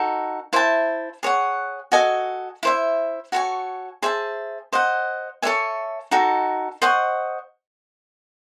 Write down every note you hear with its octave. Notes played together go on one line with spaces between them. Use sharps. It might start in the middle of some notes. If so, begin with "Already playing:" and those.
Already playing: D#4 F#4 A4
E4 C5 E5 A5
G#4 C#5 F#5
F#4 A4 D#5 G#5
E4 C5 E5
F#4 A4 C#5 G#5
G#4 C5 E5 A5
C5 D#5 F#5
A4 C#5 E5 G#5
D#4 F#4 A4
C5 D#5 F#5 C#6